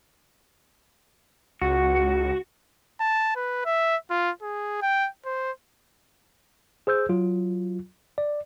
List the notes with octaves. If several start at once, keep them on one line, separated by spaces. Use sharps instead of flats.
C#2 F#4
A5
B4
E5
F4
G#4
G5
C5
G#4 C5 E6 G6
F#3 F4
D5